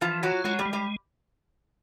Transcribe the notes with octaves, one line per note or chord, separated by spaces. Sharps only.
E3 F3 F4
F#3 F4 F#4
F#3 G#3 F#4
G3 G4
G#3
G3 G4